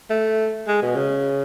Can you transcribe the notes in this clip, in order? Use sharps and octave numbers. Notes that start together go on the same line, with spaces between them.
A3
G#3
B2
C#3